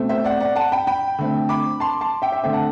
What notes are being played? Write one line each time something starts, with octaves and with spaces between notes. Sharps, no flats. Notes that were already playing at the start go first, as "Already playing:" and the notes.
Already playing: B2 A3 C4
C5 E5
D5 F#5
D5 F#5
F#5 A5
G5 B5
G5 B5
D3 A3 C4
B5 D6
A5 C6
A5 C6
E5 G5
E5 G5
D3 A3 C4 E5 G5
F#5 A5